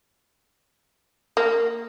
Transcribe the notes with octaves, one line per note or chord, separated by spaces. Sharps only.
A#3